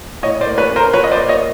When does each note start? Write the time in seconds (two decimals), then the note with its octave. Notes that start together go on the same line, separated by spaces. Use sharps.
0.23 A2 C#5 D#5
0.41 C5 D5
0.46 A#3
0.58 B4 C#5
0.70 C#4
0.76 A#4 C5
0.93 F3 B4 C#5
1.04 D#5
1.11 C5 D5
1.17 A#3
1.29 C#5 D#5